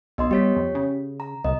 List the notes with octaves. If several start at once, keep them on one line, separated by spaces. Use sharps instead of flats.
B1 B3 D#5 C6
G3 G4 C#5 B6
F2
C#3
A#5
C2 D#5